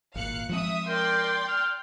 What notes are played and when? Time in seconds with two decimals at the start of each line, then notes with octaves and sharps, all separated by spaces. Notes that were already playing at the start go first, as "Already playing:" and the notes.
0.15 G#1 A#2 F5 F#6 C#7
0.49 F3 G#3 C4 E5 D#6
0.88 A#4 D5 G5 C6
1.48 F6